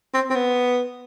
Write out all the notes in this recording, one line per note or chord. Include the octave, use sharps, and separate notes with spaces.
C4
C4
B3